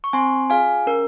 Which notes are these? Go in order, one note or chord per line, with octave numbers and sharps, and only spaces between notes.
C#6
C4 G#5 C6
F4 G#4 F5 G#5
C#4 A#4